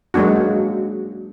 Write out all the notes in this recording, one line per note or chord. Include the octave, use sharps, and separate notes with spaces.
F#3 G#3 A#3 D4 F#4